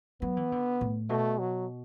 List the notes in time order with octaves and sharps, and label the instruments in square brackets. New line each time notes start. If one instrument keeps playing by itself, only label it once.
[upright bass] F#3 [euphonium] B3
[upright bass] E3
D3
A2
[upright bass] B2 [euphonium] A3
[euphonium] F#3